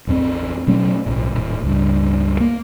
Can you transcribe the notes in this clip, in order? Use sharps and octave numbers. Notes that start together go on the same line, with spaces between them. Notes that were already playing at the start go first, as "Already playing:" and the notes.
A1 E2 B3 C4
B2 F#3 A3 C#4
B1 A2
D#1 A2
C#2 G2
A#3